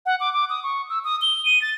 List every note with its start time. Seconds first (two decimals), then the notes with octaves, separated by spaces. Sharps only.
0.06 F#5
0.20 D6
0.33 D6
0.50 D#6
0.63 C#6
0.90 E6
1.04 D#6
1.22 G7
1.45 D#7
1.62 A6